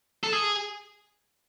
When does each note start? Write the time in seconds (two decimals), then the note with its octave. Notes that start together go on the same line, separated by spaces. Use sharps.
0.23 A4
0.32 G#4